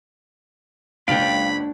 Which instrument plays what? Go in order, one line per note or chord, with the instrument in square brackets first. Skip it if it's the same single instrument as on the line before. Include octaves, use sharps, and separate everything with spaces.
[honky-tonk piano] F#1 C#2 D7 [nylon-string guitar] D4 A5 [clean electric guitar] F5 G5 [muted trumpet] B5